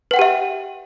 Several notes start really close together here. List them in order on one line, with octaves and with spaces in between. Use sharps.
B4 F#5 G5 G4 E5